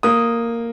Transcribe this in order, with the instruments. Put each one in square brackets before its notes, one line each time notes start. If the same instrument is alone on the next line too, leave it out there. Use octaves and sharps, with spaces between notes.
[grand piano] A#3 D#6